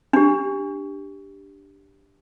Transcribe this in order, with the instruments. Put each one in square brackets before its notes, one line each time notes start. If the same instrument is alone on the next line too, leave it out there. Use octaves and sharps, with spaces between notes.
[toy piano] D4 G4